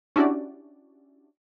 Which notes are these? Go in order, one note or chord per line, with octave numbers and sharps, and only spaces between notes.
C#4 D4 E4 F#4 G4 D5